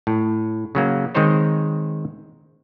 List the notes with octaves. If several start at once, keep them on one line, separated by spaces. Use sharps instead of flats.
A2
C#3 F#3 A#3
D#3 G#3 C4 D#4 C5 C#5